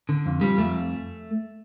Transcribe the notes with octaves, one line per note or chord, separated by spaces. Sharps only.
D3
F2
F3 G3
F2 A3